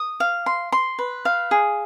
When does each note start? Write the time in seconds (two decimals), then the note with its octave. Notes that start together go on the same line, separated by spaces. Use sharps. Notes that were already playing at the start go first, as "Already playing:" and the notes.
Already playing: D#6
0.20 F5
0.46 C6
0.72 C6
0.99 B4
1.25 F5
1.51 G#4